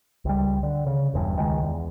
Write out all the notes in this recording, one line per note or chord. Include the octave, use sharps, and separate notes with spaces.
C#2 G3
D3
C#3
E1 E2 G2
C#2 D#3 G#3
E2